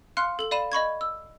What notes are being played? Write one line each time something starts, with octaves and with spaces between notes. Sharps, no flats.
F5 C6 F6 F#6 C#7
A4 F#7
D5 F5 B5 D#7 E7
D#5 B5 C#6 G#6
E6